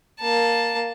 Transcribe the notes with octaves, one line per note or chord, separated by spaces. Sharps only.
A#3 A5